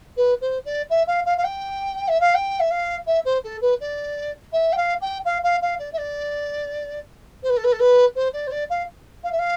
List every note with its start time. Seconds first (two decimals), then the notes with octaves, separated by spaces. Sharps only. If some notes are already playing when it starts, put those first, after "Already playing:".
0.17 B4
0.41 C5
0.64 D5
0.90 E5
1.07 F5
1.25 F5
1.37 F5
1.43 G5
2.08 E5
2.20 F5
2.34 G5
2.59 E5
2.70 F5
3.06 E5
3.25 C5
3.43 A4
3.61 B4
3.80 D5
4.52 E5
4.72 G5
4.76 F5
5.01 G5
5.25 F5
5.43 F5
5.61 F5
5.78 D5
5.92 E5
5.97 D5
7.43 C5
7.49 B4
7.56 A4
7.63 B4
7.72 A4
7.79 B4
8.15 C5
8.33 D5
8.47 C5
8.51 D5
8.69 F5
9.23 F5
9.31 E5
9.39 F5